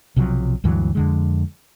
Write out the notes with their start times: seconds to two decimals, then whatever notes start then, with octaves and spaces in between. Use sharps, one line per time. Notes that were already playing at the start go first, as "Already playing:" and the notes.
0.16 B1 C3 F3 F#3
0.64 D2 G2 E3 F#3
0.95 F2 D3 G#3